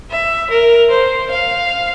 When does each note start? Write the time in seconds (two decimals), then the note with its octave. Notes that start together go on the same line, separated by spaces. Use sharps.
0.10 E5
0.50 A#4
0.91 C5
1.31 F5